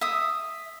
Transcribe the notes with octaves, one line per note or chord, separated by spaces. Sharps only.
E5 D#6